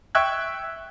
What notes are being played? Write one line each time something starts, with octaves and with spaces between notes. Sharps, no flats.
E5 G5 C#6 E6 F#6 G#6